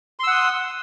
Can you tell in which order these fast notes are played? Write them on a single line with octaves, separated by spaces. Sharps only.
C6 E6 F#5 D#6